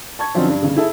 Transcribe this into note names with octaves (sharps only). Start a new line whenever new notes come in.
A5 C#6 G#6
D3 F3 F#3 C4 C#4 D#4
G2
G1 C#3
E4 G#4 A4 E5